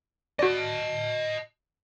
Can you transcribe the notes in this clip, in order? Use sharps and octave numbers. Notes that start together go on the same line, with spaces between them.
F#4 D5 D#5 A5